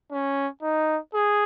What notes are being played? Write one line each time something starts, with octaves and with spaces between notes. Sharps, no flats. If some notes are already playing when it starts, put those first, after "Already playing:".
C#4
D#4
G#4